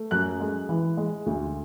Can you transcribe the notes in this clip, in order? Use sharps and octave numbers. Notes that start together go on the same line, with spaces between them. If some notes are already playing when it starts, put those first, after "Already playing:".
Already playing: A3
F#2 F#6
G#3
E3
G#3
D2